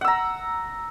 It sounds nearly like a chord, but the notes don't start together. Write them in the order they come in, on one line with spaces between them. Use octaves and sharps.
F#5 E6 A#5